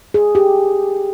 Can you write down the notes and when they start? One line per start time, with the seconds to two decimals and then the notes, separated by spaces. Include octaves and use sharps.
0.14 G#4
0.35 G4